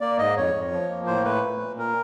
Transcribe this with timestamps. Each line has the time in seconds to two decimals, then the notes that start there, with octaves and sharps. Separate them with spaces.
0.01 A#3 D5
0.19 G#2 D#5
0.37 F2 C#5
0.54 F2
0.72 F3
0.89 A#3
1.07 A2 C5
1.24 A3 B4
1.42 A#2
1.61 A#2
1.78 A#4